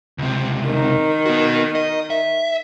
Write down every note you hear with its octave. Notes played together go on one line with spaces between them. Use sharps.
C#2 C3
D#3
B3 F#4
D#5
E5